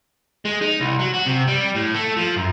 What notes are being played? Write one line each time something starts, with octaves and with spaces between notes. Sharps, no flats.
G#3
D#4
C2
F#3
F#4
C3
G3
A2
A3
F3
F#2